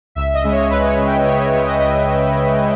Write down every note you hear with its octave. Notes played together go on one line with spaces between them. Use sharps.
C#2 E5
D#5
C#3 G#3
C#5
C#2 B4
C#5
C#3 G#3
G5
C#2 C#5
C#5
C#3 G#3 C#5
D#5
C#2 D#5